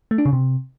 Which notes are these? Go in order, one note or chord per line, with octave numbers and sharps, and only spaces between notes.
A3
D4
C#3
C3